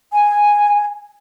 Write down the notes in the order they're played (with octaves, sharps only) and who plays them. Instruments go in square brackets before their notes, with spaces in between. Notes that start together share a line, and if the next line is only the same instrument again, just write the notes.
[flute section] G#5